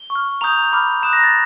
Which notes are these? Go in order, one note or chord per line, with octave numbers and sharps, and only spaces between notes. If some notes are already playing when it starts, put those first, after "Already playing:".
Already playing: G7
C#6
F6
A#5 D#6 G6 F7
B5 D6 F6
A#5 D#6 F#6 E7
A#6
A6